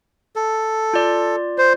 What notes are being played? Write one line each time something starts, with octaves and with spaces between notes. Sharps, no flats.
A4
F4 D5
C5